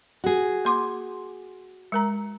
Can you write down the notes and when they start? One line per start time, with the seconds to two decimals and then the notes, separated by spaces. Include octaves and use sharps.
0.24 F#4 G#4
0.65 A#3 C6 D6
1.92 G#3 A#4 A#5